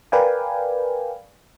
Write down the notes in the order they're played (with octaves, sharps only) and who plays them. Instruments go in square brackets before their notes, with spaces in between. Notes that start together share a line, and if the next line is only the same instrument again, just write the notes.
[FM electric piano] A#4 B4 D5 F5 G5 G#5